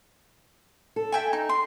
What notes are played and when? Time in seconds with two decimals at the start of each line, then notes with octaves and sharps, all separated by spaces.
0.96 A4
1.12 E5 G5 G#5
1.33 D#4
1.49 C6